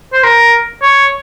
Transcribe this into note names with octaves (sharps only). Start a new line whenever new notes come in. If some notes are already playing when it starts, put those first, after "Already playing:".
C5
A#4
C#5